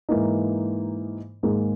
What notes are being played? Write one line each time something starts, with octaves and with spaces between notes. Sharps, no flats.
G#2 E3 A#3 D#4
G#2 D#3 A#3 D#4 G#4